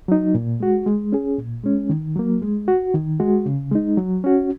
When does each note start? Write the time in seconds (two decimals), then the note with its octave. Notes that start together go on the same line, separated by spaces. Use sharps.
0.08 F#3 D#4
0.35 A#2
0.60 G#3 F#4
0.86 G#3
1.12 C#4 G#4
1.38 A#2
1.64 G#3 C#4
1.89 D#3
2.16 F#3 A#3
2.42 G#3
2.68 F#4
2.94 D#3
3.20 G#3 F#4
3.46 C#3
3.71 G#3 D#4
3.97 F#3
4.24 C#4 F#4